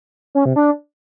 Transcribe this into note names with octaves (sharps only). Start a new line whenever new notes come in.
C#4
C3
D4